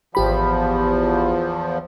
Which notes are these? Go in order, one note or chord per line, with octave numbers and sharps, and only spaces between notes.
G#1 E2 F3 G4 B5